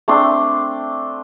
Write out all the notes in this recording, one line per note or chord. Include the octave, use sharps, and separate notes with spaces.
A3 C4 D4 C6